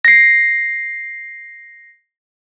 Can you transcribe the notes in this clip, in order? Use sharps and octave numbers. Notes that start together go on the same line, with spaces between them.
A#6 C7